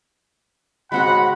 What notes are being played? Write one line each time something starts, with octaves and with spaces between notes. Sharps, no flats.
G#2 C#3 G#3 C4 F#4 F#5 B5